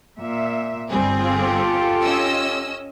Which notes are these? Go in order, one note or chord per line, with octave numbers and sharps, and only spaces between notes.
A#2 E5
G1 G3 C4 G#4
F4 G4 A4
C#4 D#5 E6